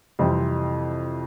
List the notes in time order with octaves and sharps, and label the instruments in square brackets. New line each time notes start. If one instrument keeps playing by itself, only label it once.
[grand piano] F2 C3 E3 G3 C4